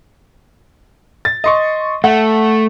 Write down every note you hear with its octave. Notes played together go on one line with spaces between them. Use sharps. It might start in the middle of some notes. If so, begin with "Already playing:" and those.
A6
D#5 C6 C#6
A3 F#5